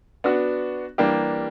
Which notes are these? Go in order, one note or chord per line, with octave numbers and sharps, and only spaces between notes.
B3 D4 F#4
E3 G3 A#3 D4 G4